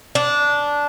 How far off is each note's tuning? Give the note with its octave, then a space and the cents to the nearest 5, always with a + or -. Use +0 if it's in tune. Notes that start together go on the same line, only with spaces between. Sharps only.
D4 -10